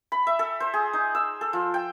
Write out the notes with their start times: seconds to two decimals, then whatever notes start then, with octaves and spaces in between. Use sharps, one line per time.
0.12 B5
0.27 E5
0.39 A4
0.60 C5
0.74 G#4
0.93 D#4
1.15 E6
1.41 A4
1.53 F3
1.74 G5